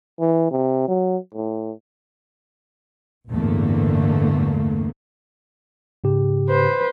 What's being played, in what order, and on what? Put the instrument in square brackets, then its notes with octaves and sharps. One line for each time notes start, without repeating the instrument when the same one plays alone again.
[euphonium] E3
C3
F#3
A2
[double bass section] A1 E2 G2 D3 A3 A#3
[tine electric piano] G#2 C#3 G4
[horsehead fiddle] B4 C5